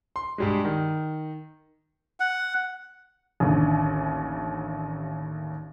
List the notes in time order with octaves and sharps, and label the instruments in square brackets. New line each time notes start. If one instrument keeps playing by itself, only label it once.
[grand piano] C6
G2 G3 G#3
D#3
[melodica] F#5
[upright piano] A1 D#2 D3